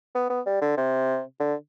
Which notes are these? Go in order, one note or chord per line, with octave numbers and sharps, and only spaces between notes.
B3
B3
G3
D3
C3
D3